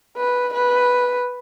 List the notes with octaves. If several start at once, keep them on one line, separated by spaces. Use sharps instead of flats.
B4
B4